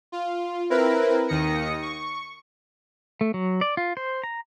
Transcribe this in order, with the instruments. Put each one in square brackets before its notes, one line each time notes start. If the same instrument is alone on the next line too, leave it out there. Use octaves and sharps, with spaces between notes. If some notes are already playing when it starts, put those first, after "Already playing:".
[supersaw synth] F4
C4 E4 A#4 B4
D#2 D#3 D#6 A#6 C#7
C#6
[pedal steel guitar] A3
F#3
D5
F4
C5
A#5